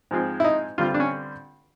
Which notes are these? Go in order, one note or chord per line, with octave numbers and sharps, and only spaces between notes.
G#2 F3 G#3 C4
E4
D#4
G2 D3 G3 C4 F4
D4
C#4